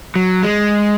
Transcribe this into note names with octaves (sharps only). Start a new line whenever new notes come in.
F#3
G#3